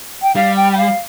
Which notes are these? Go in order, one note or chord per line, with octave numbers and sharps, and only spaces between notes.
G5
G3 F5
G5
G5
F5